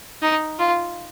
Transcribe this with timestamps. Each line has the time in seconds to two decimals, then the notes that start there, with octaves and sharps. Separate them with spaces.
0.22 D#4
0.59 F4